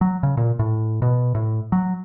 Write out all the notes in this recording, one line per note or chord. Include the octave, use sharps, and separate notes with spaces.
F#3
C#3
A#2
A2
B2
A2
F#3